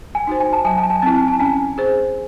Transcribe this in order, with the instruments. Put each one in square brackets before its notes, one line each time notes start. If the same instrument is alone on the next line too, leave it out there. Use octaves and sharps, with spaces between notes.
[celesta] G#5
[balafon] D#4 F#4 C5
[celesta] G#5
A5
[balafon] F#3 [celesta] G#5
[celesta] A5
G#5
[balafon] C4 E4 [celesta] A5
[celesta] G#5
A5
[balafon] C#4 [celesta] G#5
[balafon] G#4 C5